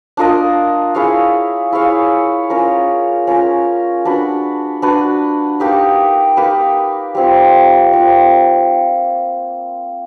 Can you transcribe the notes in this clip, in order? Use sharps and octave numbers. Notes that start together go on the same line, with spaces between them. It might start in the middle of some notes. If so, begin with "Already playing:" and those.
D4 F4 A#4 D#5
E4 G#4 C#5 F5
E4 G#4 C#5 F5
C#4 F4 A#4
C#4 F4 A#4
D4 F#4 B4
D4 F#4 B4
A#3 D#4 G4 B4
A#3 D#4 G4 B4
G3 C4 F4
G3 C4 F4